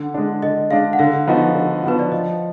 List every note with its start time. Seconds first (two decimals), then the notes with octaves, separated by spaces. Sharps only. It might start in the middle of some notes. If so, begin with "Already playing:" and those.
Already playing: D3 F#5
0.14 G#3 D4
0.43 D3 D#5
0.70 G#3 D4 F5
0.93 F#5
0.99 D3 F5
1.27 F3 B3 D#4 F#4
1.55 D3
1.83 F3 B3 D#4 F#4 B4
1.99 D5
2.12 F3 D#5